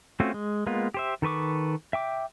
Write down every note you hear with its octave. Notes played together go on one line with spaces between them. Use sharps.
A3 C4 C#4 F4 F#4
G#3
G#3 A#3 B3 F4
G4 C5 E5
D#3 A4 B4 C#6 D6
E5 G5 D6